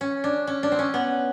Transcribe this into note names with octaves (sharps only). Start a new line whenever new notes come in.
C#4
D4
C#4
D4
C4
C#4
B3